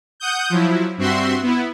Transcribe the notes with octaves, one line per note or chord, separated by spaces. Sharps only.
F#5 D#6 G6
F3 F#3 E4
G2 C4 F#4 E5 C6
B3 E4